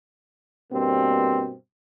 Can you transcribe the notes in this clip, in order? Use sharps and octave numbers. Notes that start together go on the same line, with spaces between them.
G2 B2 A#3 C4